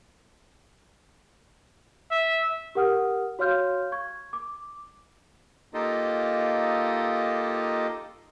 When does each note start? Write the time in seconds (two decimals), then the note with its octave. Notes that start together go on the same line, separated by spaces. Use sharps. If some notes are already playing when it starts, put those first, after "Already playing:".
2.11 E5
2.75 G4 A#4 F#5 D#6 F6
3.39 F#4 C#5 F5 C6 F6 G6
3.92 C#6 G#6
4.33 D6
5.74 A#3 D#4 F4 G4 A4 D#5